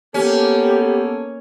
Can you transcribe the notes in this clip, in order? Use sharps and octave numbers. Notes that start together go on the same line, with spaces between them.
A#3 B3 C#4 G4 A4